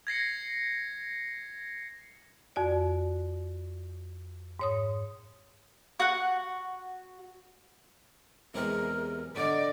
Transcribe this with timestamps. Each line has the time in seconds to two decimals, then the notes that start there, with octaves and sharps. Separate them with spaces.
0.07 G#6 A#6 C7 C#7
2.56 F2 F#4 D5
4.59 G#2 C#5 D#6
6.00 F#4 F#5
8.54 E2 C3 G#3 A#4
9.36 D3 D5 D#5